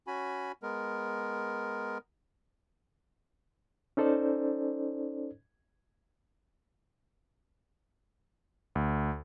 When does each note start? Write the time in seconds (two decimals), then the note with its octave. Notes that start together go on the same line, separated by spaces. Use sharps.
0.07 C#4 F#4 G#5 B5
0.63 G#3 B3 A#4
3.97 C#4 D#4 A4 C5 D5
8.75 D2